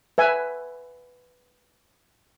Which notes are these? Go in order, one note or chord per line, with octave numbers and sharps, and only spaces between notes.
B4 E5 G#5